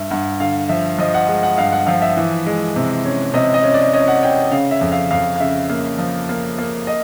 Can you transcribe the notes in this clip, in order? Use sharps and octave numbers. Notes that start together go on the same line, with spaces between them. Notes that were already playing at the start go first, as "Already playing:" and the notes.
Already playing: G2 E5
G2 F#5
D3 F5
F3 E5
F3 D#5
F#5
G#3 F#5
F#5
G2 F5
F#5
F3 F5
E5
E3
G#3
C3
C#4
C3 D#5
D#5
C#4
D5
C#4 D#5
F#5
C#4 G5
C#3 F5
E5
F2
F5
F2 F5
F5
C#3 E5
A#3
F3
A#3
A#3
D#5